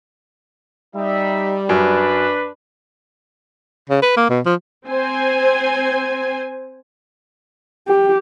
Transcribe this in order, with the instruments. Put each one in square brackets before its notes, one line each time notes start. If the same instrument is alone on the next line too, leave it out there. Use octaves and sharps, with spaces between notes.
[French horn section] G3 [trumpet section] D#4 E5
[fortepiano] F#2 [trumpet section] D4 B4
[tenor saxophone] C#3
B4
A#3
B2
F3
[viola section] C4 C5 G#5
[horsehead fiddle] G4